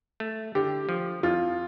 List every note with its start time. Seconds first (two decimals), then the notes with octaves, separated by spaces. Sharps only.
0.20 A3
0.55 D3 G4
0.89 F3
1.23 F2 F4